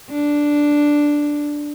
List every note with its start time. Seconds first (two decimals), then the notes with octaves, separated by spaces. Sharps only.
0.11 D4